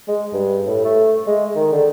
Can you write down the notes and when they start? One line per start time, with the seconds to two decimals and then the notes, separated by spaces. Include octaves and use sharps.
0.08 G#3
0.33 G2
0.66 A2
0.85 A3
1.27 G#3
1.56 D#3
1.72 D3